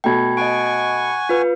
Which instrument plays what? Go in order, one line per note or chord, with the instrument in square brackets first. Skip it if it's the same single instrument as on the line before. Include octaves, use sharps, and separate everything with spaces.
[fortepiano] B2 A3 [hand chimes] G5 G#6
[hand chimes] D#5 D7 [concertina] F#5 G#5 C#6
[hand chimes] F4 B4